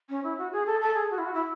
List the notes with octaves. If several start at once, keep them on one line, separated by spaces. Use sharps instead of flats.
C#4
E4
F#4
G#4
A4
A4
G#4
F#4
E4
F#4
E4